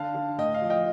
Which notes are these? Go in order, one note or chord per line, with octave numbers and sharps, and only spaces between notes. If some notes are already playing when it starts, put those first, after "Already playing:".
Already playing: D3 F5 A5
D3
A2 D#5 G5
F5
F3
D#5 G5